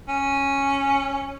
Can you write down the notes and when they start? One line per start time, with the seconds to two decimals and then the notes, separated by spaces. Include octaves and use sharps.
0.08 C#4